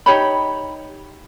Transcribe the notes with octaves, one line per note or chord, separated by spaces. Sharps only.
D#4 G4 C#5 B5